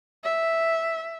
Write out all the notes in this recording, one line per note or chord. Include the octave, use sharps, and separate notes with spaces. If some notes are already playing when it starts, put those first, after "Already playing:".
E5